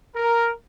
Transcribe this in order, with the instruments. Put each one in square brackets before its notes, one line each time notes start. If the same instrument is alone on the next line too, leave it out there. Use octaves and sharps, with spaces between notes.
[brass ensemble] A#4